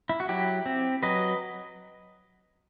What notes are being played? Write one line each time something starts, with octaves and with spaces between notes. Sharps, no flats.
E4
F#4
F#3 E4 G4
C4
F#3 B4 D#5